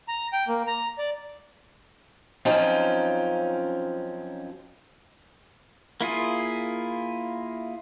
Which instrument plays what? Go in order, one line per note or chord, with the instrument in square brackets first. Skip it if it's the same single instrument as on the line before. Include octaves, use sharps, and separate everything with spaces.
[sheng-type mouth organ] A#5
G5
A#3
A#5
D5
[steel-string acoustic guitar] F#2 F3 C4 C#4 D#4 F4
[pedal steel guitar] A#3 E4 F4 G#4